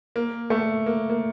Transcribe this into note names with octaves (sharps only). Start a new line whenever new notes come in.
A#3
A3
A#3
A#3